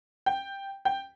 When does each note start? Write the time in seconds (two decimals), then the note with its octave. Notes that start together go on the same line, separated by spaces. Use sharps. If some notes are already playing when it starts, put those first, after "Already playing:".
0.26 G5
0.85 G5